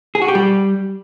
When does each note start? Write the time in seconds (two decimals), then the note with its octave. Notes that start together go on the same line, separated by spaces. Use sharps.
0.15 G#4
0.22 F#4
0.28 G4
0.35 G3